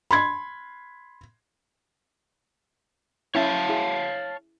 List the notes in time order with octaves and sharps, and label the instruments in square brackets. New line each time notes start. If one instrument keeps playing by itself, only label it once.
[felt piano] B5 C6 G#6
[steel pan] C#4 E4 [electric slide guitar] C#5 F5 A5
[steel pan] E4 G#4